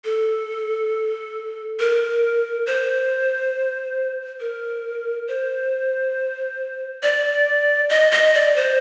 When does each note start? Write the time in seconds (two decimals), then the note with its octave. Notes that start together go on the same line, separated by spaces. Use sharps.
0.05 A4
1.80 A#4
2.66 C5
4.40 A#4
5.28 C5
7.03 D5
7.89 D#5
8.12 D#5
8.34 D5
8.56 C5